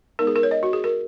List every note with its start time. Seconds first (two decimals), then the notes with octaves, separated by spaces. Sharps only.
0.19 G#3 B3 D#4 A#4
0.27 G#4
0.36 A#4
0.43 C#5
0.51 D#5
0.63 F#4
0.73 G#4
0.84 A#4